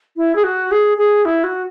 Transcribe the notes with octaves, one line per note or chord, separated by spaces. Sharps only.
E4
G#4
F#4
G#4
G#4
E4
F#4